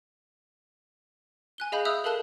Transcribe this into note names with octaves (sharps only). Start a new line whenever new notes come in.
G#5 F#6 G7
G#4 D#5 F5 B5 G6
E5 D#6 E6 F#6 G6 F7
A4 A#4 F5 A5 F#6 G7